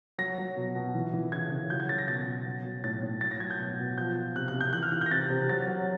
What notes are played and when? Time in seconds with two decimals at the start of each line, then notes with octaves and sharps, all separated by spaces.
0.18 F#3 A#6
0.38 F#3
0.57 B2
0.75 B2
0.95 E3
1.13 E3
1.32 C#3 G#6
1.51 C#3
1.70 F#3 G6
1.80 G#6
1.89 F#3 A6
1.98 A#6
2.08 B2 A6
2.27 B2
2.46 F#3
2.65 F#3
2.84 A2 A6
3.03 A2
3.21 F#3 A6
3.31 A#6
3.40 F#3 G#6
3.51 G6
3.60 B2
3.79 B2
3.98 F3 G6
4.16 F3
4.35 C3 F#6
4.48 F#6
4.54 C3
4.61 G6
4.73 E3 F#6
4.83 F6
4.92 E3 F#6
5.01 G6 A#6
5.11 C3 A6
5.30 C3
5.49 F#3 A6
5.68 F#3